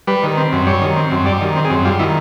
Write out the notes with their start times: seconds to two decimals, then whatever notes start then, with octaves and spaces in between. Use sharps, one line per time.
0.07 G3 B4
0.23 D#3
0.37 C4
0.52 F#2
0.67 G3 C#5
0.81 D#3
0.96 C4
1.11 F#2
1.25 G3 D5
1.41 D#3
1.56 C4
1.65 G#4
1.70 F#2
1.85 G3 F4
1.99 D#3 E4